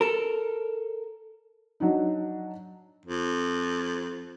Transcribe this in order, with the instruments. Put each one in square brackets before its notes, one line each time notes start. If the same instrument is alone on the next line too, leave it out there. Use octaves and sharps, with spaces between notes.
[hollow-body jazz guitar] A4 A#4
[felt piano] F#3 D4 D#4
[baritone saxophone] F2